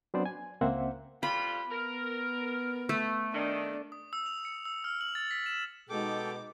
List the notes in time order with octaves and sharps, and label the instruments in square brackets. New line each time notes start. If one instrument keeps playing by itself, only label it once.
[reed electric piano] F#3 B3 C4 D4 C5 D5
G#5
C#2 A#3 C4 C5 E5 F#5
[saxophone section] F2 G3 F4 [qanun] B5
[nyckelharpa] B3 [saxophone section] A#4
[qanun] A3
[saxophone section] D#3 [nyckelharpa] D4
[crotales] D#6
E6
F7
C#7
E6
F6
F#7
A6
B6
E7
[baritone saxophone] B2 [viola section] G#3 D#4 [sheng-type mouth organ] A4 G5 [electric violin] D6